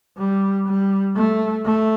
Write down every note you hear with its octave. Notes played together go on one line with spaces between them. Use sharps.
G3
G3
A3
A3